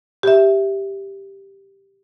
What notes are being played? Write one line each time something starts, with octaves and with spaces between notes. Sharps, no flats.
G4 E5